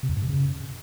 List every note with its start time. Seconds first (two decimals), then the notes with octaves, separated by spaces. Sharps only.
0.03 C3
0.09 E2
0.16 G#2
0.22 C3
0.28 C#3